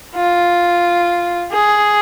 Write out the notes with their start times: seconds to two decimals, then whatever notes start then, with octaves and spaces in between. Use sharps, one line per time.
0.15 F4
1.52 G#4